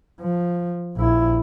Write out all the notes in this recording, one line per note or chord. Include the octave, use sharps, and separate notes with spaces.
F3
A#1 E4